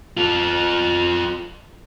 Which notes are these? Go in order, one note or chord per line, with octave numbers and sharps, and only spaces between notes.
F4 A4